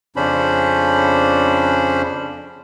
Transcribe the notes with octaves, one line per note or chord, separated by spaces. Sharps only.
F2 C#3 C#4 D4 C5 B5